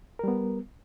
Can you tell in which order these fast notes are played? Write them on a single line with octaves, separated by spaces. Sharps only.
A#4 G3 B3